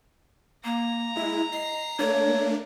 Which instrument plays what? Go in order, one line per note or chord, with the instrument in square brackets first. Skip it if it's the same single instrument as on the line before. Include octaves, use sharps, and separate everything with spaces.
[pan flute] A#3 [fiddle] A#5
[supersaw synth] G#3 E4
[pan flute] D#5 [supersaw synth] C7
[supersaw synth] A3 A#3 D4 [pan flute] C#5